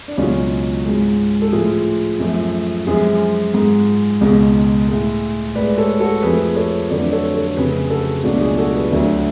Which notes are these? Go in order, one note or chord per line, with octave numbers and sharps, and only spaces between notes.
D4
C#2 B2 F#3 C#4 F4
G#2 G#3
A4
A2 F3 G#3 F4 G#4
F#2 F3 A3
F#2 F3 G#3 F4 G#4
G#2 G#3
C#2 B2 G#3
A2 G#3
A2 G#3 B4 D5
A4 C#5
F#4 A4
F2 F3 A3 G#4 B4
A4 C#5
F2 D3 F#3 A3 B4 D5
A4 C#5
A4 C#5
F2 C#3 F#3 A3 G#4 B4
F#4 A4
G#4
C#2 B2 F#3 A3 D4 F#4
F4 G#4
F#4 A4
G#4 B4
D2 D3 F#3 A3